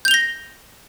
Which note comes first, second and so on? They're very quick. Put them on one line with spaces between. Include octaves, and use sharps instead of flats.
G6 F7 G7 A#6